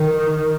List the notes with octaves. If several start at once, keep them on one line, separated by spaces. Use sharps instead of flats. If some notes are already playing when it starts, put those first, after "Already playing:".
Already playing: D#3